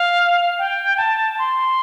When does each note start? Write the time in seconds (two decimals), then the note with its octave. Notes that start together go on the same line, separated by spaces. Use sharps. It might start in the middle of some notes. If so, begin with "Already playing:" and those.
Already playing: F5
0.59 G5
0.98 A5
1.39 C6